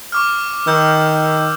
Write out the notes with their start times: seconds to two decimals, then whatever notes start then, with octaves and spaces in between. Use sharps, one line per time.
0.12 C#6 D6 F6
0.67 D#3 E6 G6